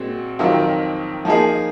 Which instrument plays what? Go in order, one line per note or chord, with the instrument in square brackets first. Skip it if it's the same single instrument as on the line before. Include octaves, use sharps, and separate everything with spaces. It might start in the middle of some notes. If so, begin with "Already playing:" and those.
Already playing: [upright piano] A#2 G#3 C4 F#4
F2 D#3 F#3 C4 F4
F3 A#3 D#4 G#4